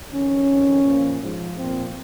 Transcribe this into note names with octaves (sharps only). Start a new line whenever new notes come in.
F2 D#3 C#4
F2 D#3
A#2 F3
G#2 F3
A#2 F3 C4